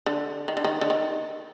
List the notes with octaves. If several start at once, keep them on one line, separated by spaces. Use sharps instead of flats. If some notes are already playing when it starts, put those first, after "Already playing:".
D3
D#3
D3
D#3
D3
D#3